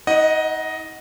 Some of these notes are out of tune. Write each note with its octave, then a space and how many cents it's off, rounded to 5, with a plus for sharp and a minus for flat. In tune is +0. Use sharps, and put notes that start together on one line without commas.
D#4 +40 D#5 +0 F#5 +0